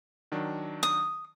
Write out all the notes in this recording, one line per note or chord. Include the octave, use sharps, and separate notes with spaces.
D#3 F#3 D4
D#6